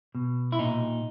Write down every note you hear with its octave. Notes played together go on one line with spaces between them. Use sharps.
B2
E4
A#2 D#4